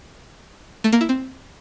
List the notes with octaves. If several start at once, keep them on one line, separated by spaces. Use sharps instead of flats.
A3
A#3
E4
C4